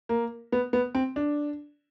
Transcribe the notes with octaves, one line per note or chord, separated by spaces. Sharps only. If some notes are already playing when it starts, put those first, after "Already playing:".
A#3
B3
B3
C4
D4